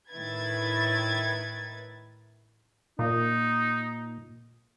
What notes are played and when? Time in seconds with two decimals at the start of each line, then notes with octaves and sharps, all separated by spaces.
0.12 A2 D#3 E4 B4 G#6 A6
2.99 A#2 D#4